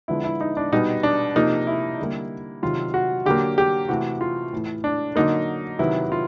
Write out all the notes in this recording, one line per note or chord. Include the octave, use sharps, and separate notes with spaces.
D3 F3 G#3 B3 E4
E4
D#4
D4
B2 G3 B3 D#4
D4
C3 F3 A#3 D#4
E4
D3 G3 A#3
C3 D#3 F#3 F4
F#4
D3 F#3 A#3 G4
G4
C3 E3 A3 F#4
F4
A2 E3 A3
D4
D3 F#3 A#3 D#4
C3 D#3 F#3 B3 E4
F4